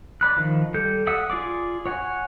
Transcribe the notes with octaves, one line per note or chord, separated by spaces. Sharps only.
D5 B5 F#6
D#3 F3
G3 A4 G6
D5 E5 F#5 D#6 E6
F4 G#4 D5 D6
C#5 F#5 G#5